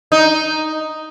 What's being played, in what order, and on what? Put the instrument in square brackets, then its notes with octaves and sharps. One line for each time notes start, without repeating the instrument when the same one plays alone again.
[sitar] D#4